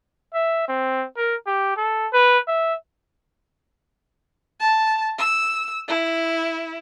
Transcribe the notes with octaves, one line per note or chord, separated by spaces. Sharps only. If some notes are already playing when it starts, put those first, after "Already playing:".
E5
C4
A#4
G4
A4
B4
E5
A5
E6
E4